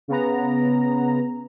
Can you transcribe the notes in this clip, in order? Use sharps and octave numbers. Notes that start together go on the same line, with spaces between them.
C#3 B3 A#5